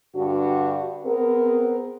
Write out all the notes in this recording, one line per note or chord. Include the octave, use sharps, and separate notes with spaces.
G2 D3 D4 F#4
B3 C4 G#4 A#4